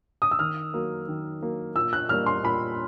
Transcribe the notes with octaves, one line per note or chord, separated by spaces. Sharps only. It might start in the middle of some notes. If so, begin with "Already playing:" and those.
D#6
E6
D#3 F6
F#3 A#3
D#3
F#3 A#3
A#2 E6
F#6
G3 A#3 F6
C6
A#2 B5